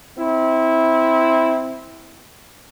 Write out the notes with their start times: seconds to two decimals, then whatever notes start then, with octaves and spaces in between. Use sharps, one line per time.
0.18 C4 E4